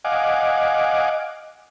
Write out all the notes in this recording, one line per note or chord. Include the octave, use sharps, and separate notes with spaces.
D#5 F5 F#5 G#5 D6